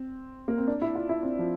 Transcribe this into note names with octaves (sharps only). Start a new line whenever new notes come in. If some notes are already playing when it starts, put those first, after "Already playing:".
Already playing: C4
A#3
C4
D4
E4
F4
E4
C4
F3